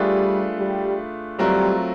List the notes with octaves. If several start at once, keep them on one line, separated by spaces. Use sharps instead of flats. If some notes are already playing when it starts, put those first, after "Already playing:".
Already playing: G3 A3 D4 F4 G#4 B4
G3
F#3 G3 A3 C4 F4 A#4